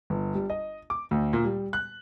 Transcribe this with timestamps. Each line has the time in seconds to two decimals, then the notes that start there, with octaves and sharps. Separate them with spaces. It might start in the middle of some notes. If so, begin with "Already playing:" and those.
0.10 G1
0.35 G3
0.50 D#5
0.90 D6
1.11 D2
1.33 A#2
1.45 G3
1.73 F#6